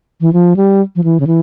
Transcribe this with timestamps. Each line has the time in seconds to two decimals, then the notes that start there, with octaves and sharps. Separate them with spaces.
0.21 E3
0.33 F3
0.56 G3
0.96 F3
1.04 E3
1.20 C#3
1.27 E3